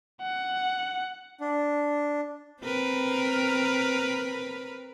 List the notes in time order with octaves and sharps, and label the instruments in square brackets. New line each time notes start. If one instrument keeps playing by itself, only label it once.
[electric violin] F#5
[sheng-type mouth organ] D4
[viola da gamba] C4 A#4 B4